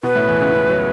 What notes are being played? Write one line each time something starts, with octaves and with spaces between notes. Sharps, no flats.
B2 B3 B4
A2 A3
E2 E3
C#2 C#3
C#2 C#3
F#3